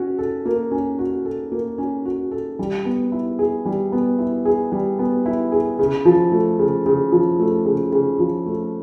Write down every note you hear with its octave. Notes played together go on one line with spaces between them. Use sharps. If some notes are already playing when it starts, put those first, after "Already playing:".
Already playing: C#4 F#4
A4
A#3
C#4
F#4
A4
A#3
C#4
F#4
A4
G3
B3
E4
G#4
G3
B3
E4
G#4
G3
B3
E4
G#4
C#3
F3
A3
C#3
C#3
F3
A3
C#3
C#3
F3
A3